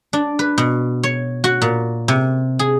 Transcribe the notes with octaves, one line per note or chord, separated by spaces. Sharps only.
D4
B4
B2
C#5
F#4
A#2
C3
G#4